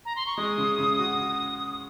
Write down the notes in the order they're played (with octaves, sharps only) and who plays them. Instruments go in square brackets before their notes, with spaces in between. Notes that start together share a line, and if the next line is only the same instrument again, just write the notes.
[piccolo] A#5
C6
C#6
[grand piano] G#3 [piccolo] D#6
[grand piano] C#3
C#3
F#4